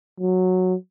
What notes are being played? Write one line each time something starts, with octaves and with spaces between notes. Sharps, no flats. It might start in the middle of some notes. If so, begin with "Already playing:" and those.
F#3